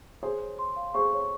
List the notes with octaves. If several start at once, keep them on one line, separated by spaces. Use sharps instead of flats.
G#4 C5 C#5
C#5
C6
F5
G#4 C5 C#6
C#5